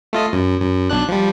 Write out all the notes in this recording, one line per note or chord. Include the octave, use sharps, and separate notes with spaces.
A3 F4 D#5
F#2
F#2
B1 D4 F#6
F3 G3